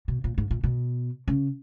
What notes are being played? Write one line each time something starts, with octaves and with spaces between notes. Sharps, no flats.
B2
A#2
G#2
A#2
B2
C#3